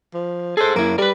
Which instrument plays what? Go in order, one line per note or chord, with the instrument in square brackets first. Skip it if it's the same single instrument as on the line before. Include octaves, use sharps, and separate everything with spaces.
[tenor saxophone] F3
[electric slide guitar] G#4 C5 [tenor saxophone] A4
[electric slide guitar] F#2 E4 [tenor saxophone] A#3
[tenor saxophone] G3 [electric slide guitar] A#4 B4